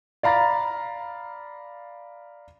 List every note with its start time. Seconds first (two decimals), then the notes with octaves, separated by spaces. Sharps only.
0.23 D5 F5 A#5 B5 A6